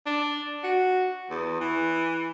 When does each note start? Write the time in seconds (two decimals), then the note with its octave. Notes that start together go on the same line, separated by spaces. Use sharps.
0.06 D4
0.63 F#4
1.30 E2
1.60 E3